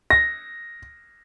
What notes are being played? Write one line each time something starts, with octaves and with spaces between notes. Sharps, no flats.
A#6